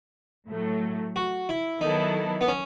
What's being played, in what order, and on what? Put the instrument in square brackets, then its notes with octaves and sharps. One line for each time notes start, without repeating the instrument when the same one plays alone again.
[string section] A2 F#3 A3
[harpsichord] F#4
E4
[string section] D#3 F#3 B3 E4 A4 [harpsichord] D#4
[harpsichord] B3
C#4